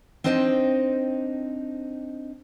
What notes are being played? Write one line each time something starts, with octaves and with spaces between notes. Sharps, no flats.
C4 D4 D#4 C5 D#5 G5